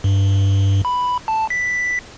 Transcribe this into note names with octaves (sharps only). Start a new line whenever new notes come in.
G2
B5
A5
B6